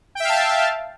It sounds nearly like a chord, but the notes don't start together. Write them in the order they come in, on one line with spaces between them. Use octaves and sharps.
G5 E5 F5 A5